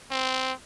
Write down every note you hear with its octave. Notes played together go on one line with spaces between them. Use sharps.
C4